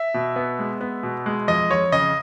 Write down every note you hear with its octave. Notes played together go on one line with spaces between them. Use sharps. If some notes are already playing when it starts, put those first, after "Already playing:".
Already playing: E5
B2
B3
G#3
B3
B2
G#3
F2 D#5
F2 C#5
C#3 D#5